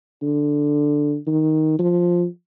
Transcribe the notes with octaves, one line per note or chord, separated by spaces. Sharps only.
D3
D#3
F3